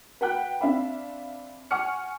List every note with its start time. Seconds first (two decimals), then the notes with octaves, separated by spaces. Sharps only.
0.21 B4 F#5 G5 F#6
0.61 C4 D4 E5 F5 B5
1.71 F#5 G#5 C#6 F6 C#7